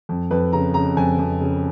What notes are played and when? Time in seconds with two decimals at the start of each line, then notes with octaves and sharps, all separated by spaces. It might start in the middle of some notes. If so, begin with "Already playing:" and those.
0.09 F2
0.31 F2 B4
0.53 C#3 A#5
0.74 C#3 A#5
0.97 F2 G#5
1.19 F2
1.41 C#3